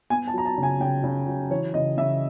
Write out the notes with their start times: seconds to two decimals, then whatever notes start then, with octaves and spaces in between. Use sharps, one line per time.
0.10 B3 G#5
0.28 A5
0.34 F#3 A#5
0.46 A5
0.58 C#3
0.63 G#5
0.80 C#3 G5
1.04 C#3
1.28 F#3
1.50 E3 C#5
1.74 C#3 D#5
1.97 C#3 E5